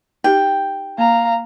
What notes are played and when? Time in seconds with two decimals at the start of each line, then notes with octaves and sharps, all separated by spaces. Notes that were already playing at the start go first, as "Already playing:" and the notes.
0.24 D#4 G4 G5
0.98 A#3 F5 A#5